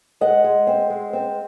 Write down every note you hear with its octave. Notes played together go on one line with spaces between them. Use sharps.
G#3 D#5 F#5
G#3
C4
G#3
C4